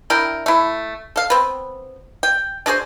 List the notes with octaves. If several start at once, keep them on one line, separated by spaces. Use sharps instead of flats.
D4 E4 A#4 G5
A3 E4
A4 F5
B3 C4
G5
D4 F#4 G#4 C5